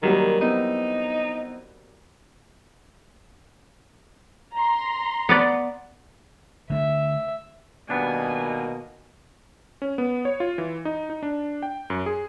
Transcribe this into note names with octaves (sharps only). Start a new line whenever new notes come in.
D#3 F#3 G3 A#3
B3 C4 D#4 E4
A#5 C6
B3 B4 D5
D3 A3 E5
B2 D#3 G3 A#3 B3 D4 G#5
C#4
B3
C#5
F4
E3
D#4
D#4
D4
G5
F#2
G#4